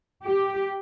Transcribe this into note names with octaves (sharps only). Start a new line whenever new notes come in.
G4